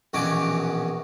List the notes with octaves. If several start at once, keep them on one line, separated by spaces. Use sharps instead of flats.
A#1 B2 D#3 E3 C#4 D6